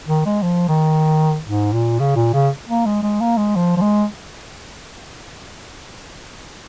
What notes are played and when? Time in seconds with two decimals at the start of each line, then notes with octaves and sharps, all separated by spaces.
0.08 D#3
0.26 G#3
0.42 F3
0.69 D#3
1.47 G#2
1.73 A#2
2.00 C#3
2.16 A#2
2.34 C#3
2.68 A#3
2.86 G#3
3.03 G#3
3.21 A#3
3.38 G#3
3.56 F3
3.77 F3
3.82 G#3